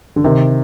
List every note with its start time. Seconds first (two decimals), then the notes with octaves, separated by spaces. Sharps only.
0.16 D3
0.24 C3 D#3